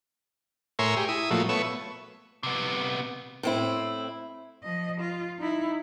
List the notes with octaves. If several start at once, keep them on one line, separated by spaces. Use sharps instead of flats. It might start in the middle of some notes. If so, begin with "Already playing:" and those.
A2 A#4 C#5 E5 G#5 C6
G4 G#4
E4 D#6
A#2 F3 F#3 A3
A3 B3 C#5 E5
C3 B3
A2 C4 E4
F3 D#5
F4
D#4 E4